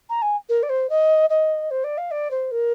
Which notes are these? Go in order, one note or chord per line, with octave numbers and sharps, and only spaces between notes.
A#5
G#5
A#4
D5
C5
D#5
D#5
C5
D5
F5
D5
C5
A#4